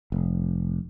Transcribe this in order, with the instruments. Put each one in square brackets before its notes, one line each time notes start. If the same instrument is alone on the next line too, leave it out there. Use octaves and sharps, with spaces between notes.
[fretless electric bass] F1